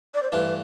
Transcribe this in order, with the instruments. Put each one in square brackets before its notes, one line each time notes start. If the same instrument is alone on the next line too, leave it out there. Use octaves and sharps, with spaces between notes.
[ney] D5
C5
[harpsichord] G2 E3 A3 D4 F4 [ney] B4